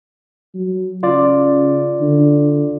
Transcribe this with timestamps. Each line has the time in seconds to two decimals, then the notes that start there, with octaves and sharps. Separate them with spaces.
0.55 F#3
1.03 C#3 F4 D5
2.00 D3